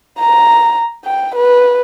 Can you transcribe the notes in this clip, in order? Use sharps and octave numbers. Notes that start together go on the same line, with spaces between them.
A#5
G5
B4